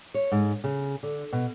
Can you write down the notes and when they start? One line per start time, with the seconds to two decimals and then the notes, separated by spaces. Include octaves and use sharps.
0.14 C#5
0.32 G#2
0.64 C#3
1.03 D3
1.33 B2